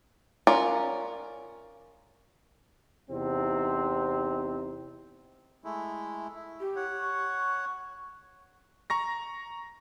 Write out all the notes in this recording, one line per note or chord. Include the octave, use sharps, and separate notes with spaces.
C#4 F4 A#4 D5
E2 C3 C4 D#4
G#3 A3 E4
E4
G4
C#5 F#5
C#6
A#5 C#6 A#6